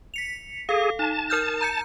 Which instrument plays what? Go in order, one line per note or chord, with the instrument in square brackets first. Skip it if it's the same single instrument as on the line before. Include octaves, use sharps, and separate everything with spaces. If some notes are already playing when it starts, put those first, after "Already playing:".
[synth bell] B6 C#7 F7
[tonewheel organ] G#4 [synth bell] A4 F5
[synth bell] D#4 [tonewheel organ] A5
[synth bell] A#4 F6 G6
A#5 G6 C#7